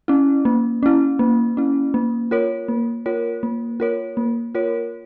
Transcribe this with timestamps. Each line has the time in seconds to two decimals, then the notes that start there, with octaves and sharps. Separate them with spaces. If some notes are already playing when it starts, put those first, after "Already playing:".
0.08 C#4 E4
0.45 A#3
0.83 C#4 E4
1.19 A#3
1.57 C#4 E4
1.94 A#3
2.31 F4 A#4 C#5
2.68 A#3
3.06 F4 A#4 C#5
3.43 A#3
3.80 F4 A#4 C#5
4.17 A#3
4.55 F4 A#4 C#5